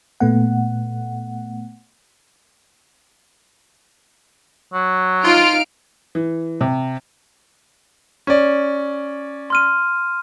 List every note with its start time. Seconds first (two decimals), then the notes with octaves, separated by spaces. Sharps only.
0.20 A#2 A3 B3 F#5
4.73 F#3
5.25 D#4 F4 F5 F6 D7
6.15 E3
6.61 C3
8.27 C#4 D5
9.50 C6 F6 D#7